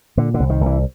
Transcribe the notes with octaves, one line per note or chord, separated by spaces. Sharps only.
A#2 D3
D3
C2
D#3
C2
E3